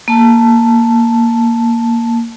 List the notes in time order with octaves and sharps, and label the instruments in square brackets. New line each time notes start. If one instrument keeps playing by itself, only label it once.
[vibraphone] A#3 A5